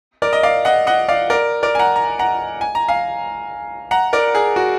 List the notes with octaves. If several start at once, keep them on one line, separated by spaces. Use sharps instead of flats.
A#4 D5
D#5
D5 F5
D#5 F#5
D#5 F#5
D5 F5
A#4 D5
A#4 D5
G#5
F#5 A#5
A#5
F#5 A#5
G#5
A#5
F5 G#5
F#5 A#5
A#4 D5
G#4
F#4